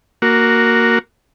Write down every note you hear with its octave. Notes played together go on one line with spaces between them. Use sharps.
A#3 F#4